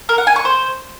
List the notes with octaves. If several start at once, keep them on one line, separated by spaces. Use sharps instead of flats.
A#4
F#5
G#5
C#6
C5